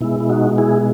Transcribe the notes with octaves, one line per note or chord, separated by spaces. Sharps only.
B2 G#3 E4
E4
D#4 F#4
E4 G#4